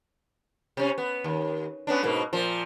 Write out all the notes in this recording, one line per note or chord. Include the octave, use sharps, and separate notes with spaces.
C3 C#4
B3
D#2
B3 C#4 D4
G#2 B2 A#3
A#2 F3